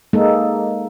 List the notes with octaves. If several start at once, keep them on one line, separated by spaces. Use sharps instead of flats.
G#3 A#3 D#4 A4